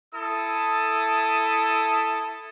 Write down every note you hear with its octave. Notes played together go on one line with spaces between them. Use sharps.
E4 A4 D#6